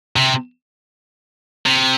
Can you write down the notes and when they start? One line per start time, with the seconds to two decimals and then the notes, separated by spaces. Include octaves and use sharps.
0.16 C3
1.66 C3